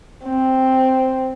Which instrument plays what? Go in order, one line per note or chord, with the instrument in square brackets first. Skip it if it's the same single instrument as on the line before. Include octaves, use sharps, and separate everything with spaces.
[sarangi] C4